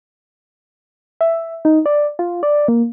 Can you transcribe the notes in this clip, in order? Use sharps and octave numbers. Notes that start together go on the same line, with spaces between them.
E5
D#4
D5
F4
D5
A#3